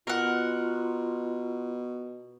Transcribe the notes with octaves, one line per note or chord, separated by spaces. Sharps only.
B2 F4 A#4 F#5